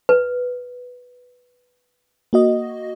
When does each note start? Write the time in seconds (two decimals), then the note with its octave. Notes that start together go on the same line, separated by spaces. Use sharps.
0.09 B4
2.33 A#3 F#4 D#5